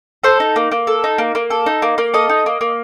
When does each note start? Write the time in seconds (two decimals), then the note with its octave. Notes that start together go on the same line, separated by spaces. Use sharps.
0.24 A4 C5
0.40 D#4
0.56 A#3
0.71 A#3
0.87 A4
1.04 D#4
1.18 A#3
1.35 A#3
1.50 A4
1.66 D#4
1.82 A#3
1.98 A#3
2.14 A4 D#5
2.29 D#4
2.46 A#3
2.61 A#3